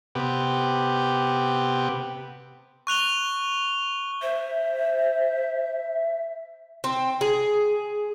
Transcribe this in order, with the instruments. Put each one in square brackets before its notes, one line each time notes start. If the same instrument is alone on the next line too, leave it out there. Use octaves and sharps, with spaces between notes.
[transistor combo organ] C3 B3 G4
[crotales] C#6 F#6 F7 G7
[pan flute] C5 [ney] E5
[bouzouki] C4
G#4